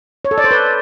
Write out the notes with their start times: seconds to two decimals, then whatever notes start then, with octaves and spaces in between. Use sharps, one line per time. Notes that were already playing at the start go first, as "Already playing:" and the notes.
0.25 C#5
0.31 A4
0.38 D5
0.44 C5
0.51 B4